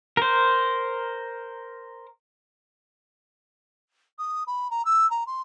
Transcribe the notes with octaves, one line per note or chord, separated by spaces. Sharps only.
A#4 C5
D#6
B5
A#5
E6
A#5
C6